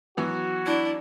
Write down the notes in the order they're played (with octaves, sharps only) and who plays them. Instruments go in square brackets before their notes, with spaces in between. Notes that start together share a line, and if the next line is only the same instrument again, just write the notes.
[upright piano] E3 F#3 B3 [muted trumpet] F#4
[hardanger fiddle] D4 [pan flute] E4